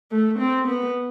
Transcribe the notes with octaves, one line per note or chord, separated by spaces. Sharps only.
A3
C4
B3